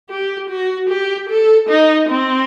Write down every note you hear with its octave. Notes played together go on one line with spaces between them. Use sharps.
G4
F#4
G4
A4
D#4
C4